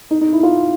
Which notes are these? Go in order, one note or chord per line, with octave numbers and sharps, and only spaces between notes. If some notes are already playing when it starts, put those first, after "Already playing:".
D#4
D#4
E4
F4